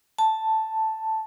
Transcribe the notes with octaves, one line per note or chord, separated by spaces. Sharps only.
A5